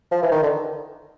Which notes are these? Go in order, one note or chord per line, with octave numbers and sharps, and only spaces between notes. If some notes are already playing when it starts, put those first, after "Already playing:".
F3
E3
D#3
D3